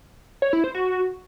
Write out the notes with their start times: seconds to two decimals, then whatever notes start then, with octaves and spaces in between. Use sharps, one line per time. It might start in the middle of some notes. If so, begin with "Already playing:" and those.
0.42 C#5
0.53 E4
0.64 C5
0.75 F#4